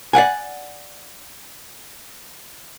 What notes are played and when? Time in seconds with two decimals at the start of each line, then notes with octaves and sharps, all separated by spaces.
0.13 D5 F5 F#5 G#5